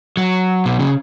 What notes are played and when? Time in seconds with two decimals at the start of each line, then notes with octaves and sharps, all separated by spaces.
0.17 F#3
0.66 B2
0.79 C#3